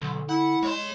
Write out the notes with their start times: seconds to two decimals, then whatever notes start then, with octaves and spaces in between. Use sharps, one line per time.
0.02 B1 D3
0.29 E4 F#5
0.63 G#3 C#5 C6